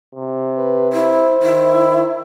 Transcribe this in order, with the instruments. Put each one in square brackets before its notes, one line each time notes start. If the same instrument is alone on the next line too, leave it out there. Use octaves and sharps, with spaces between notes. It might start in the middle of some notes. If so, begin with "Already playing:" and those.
[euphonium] C3
[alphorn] B4
[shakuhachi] E4 [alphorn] C5
[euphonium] D#3 [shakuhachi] E4